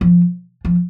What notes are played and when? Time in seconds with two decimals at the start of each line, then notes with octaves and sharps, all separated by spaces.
0.01 F3
0.65 F3